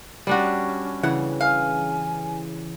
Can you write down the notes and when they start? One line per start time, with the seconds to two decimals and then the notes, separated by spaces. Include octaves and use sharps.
0.27 G3 C#4 D4 F#4
1.03 C#3 E3 F#5
1.41 F5 G#5